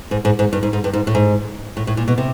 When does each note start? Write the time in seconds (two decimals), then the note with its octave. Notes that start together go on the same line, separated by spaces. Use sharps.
0.11 G#2
0.25 G#2
0.39 G#2
0.53 G2
0.63 G#2
0.73 G#2
0.84 G2
0.93 G#2
1.07 A2
1.15 G#2
1.77 A2
1.87 A2
1.97 A#2
2.08 B2
2.18 C3